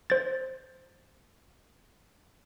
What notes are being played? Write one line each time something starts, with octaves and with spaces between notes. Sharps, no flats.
C5 A6